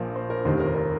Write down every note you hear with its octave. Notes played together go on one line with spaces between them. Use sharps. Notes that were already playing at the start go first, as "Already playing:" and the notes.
Already playing: A#1 A#2 F3 A#4 C5
C5
A#4
F1 D#2 D#3 C5
A#4
A#4